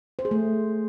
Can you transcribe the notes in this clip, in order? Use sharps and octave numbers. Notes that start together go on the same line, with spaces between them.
C5
G#4
A3